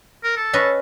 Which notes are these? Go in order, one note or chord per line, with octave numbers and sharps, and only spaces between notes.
A#4
A4
C#4 B4 D#5